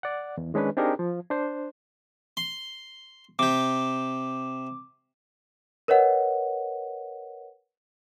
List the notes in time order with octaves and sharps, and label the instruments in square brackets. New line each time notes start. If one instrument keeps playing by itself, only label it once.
[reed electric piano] D5 F#5
E2
D#3 G#3 C#4 D4 B4
C4 D4 D#4 G4 G#4 A#4
F3
D4 C5
[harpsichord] C6
[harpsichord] C3 G4 [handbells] D6
[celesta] A#4 B4 C#5 D#5 F#5